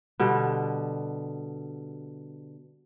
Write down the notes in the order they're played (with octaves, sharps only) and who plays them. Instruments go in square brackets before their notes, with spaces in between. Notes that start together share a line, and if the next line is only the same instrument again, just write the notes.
[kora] B2 D3 G3